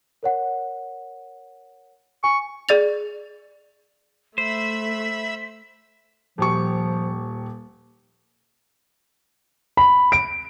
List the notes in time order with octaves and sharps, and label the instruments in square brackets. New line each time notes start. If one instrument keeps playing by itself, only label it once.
[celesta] A#4 C#5 F#5
[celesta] G#5 [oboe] C#6
[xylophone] G#4 D5 A6 F7
[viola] A3 [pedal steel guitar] C5 [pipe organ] E5 B5 E6 [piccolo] B6
[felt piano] D#1 G4 C#6 [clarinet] F3
[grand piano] B5
D7